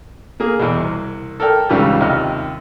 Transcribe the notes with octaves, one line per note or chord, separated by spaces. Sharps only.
A#3 G#4
E2 B2
C2
A4 A#4 D5 G5
C#2 G#2 C#3 E3 G3
D#2 C3 D#5 F6